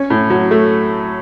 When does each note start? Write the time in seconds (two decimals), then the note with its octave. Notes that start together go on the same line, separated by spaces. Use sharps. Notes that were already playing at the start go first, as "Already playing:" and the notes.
Already playing: C#4
0.10 A2
0.30 F#3
0.51 A3